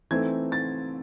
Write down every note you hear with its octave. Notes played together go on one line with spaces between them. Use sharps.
E3 A3 C4 D#4 G#6
A6